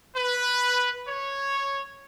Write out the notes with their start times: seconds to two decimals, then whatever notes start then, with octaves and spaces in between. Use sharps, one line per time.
0.15 B4
1.08 C#5